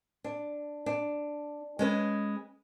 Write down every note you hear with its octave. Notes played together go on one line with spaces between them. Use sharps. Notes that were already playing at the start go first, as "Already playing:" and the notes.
D4
D4
G#3 C#4 B4